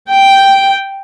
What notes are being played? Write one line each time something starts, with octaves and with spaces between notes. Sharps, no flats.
G5